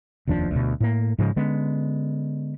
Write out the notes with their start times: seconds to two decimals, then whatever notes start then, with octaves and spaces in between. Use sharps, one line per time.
0.27 F1 D#2 F3 D4
0.51 D2 B2
0.80 A2 A#3
1.19 G#2 C#3 F3 G#3
1.36 D3 G#3 B3 C#4